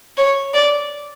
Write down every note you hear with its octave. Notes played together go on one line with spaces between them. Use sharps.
C#5
D5